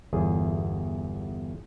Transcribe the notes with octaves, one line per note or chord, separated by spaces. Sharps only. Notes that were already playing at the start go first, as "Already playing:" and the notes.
G1 E2 G#4